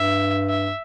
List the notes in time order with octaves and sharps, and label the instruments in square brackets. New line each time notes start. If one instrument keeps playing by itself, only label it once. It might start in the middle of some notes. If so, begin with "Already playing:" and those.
Already playing: [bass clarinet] G2 [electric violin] E5
[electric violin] E5